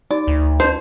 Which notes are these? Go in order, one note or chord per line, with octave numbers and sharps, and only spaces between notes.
D#4 D5
D2
C#4 B4 C5 A5